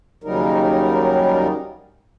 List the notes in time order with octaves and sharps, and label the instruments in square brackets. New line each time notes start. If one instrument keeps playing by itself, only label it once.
[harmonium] D#2 C#3 F#3 G3 D#4 A#4